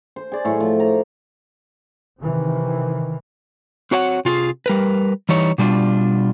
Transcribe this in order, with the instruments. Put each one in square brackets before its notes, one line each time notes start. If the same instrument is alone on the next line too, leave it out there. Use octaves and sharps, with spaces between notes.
[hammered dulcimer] C5
G#4 D5
A2 F#3
F3
A#5
[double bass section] C3 D#3 E3
[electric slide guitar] C4 F#4 C#5 F5 F#5
C3 F4 F#4 G#4
G3 A#4 B4
E3 G3 D#4 C#5
B2 G3 D4 F4